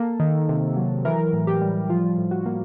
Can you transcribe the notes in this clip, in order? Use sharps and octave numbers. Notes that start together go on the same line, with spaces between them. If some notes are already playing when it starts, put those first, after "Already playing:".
Already playing: A#3 A4
D#3
C3
F#3
E3 A#4
A2
G4
G3
F3 F4
A2
F#4
A#3